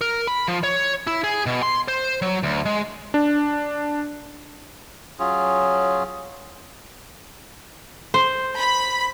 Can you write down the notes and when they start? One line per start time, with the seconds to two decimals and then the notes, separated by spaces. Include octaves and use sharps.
0.01 A#4
0.27 B5
0.48 F3
0.63 C#5
1.07 E4
1.24 G#4
1.46 B2
1.62 C6
1.88 C5
2.22 F#3
2.43 D2
2.66 G#3
3.14 D4
5.19 F#3 C#4 F4 G#4
8.14 C5
8.58 B5